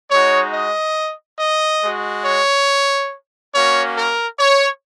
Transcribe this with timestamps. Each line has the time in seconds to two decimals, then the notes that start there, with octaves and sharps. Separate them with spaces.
0.11 G#3 D#4 F#4 C#5
0.54 D#5
1.39 D#5
1.83 G#3 F#4
2.25 C#5
3.54 A#3 C#4 F#4 C#5
3.97 A#4
4.39 C#5